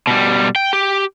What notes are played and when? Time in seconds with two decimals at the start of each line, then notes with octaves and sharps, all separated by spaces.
0.07 B2 G3
0.56 G5
0.73 G4